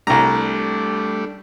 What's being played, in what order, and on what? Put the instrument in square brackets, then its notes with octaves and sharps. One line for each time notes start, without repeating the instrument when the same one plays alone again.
[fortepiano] C2 A#5 [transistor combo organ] G3 A3 D4